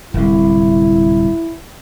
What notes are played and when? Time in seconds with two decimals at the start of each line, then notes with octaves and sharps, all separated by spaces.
0.14 D1 C2 E4